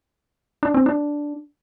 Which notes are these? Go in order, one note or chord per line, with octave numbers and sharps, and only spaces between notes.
D4
C4
D4